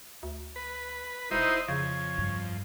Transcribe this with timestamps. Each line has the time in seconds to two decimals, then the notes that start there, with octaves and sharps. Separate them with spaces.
0.23 D2
0.56 B4
1.31 E1 D#4 E4 C5 D#5
1.68 F2 C#3 C#5
2.18 G2